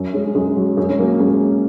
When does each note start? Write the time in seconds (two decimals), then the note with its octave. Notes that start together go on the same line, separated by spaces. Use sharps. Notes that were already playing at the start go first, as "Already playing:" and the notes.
Already playing: F#2
0.13 G#3 C#4
0.35 F#2 G#3
0.57 F#3
0.77 F#2 G#3
0.89 C#4
0.98 F#3 A#3
1.19 F#2 G#3 C#4